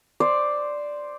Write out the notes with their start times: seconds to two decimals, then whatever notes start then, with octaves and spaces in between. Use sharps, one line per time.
0.20 C5 D5